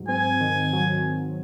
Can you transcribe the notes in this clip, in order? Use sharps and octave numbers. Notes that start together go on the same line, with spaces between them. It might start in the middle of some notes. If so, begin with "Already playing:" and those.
Already playing: G#2 F#3
C4 G#5
D#3
F#3